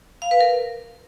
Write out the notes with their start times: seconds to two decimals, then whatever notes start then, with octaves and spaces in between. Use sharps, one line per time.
0.22 F5
0.31 B4
0.41 A#4